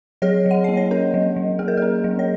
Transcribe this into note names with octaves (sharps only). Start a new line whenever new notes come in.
F#3 G#4 C#5
F#3
F#5
A#3 D#5
C#5
C#4 A#4
F#3
F#3
A#3 G#4
A#4
C#4 G#4
F#3
C#5